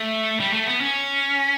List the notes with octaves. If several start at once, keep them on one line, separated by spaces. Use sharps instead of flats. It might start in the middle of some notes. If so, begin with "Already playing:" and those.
Already playing: A3
G3
A3
B3
C#4